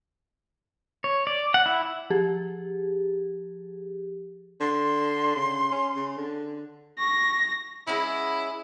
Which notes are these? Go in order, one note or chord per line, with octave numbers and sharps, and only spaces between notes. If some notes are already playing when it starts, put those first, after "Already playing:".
C#5
D5
F#5
E4
F3 G4 G#4
D3 C6
C#3
C#4
C#3
D3
C#6 A#6
G#3 B3 C#4 E4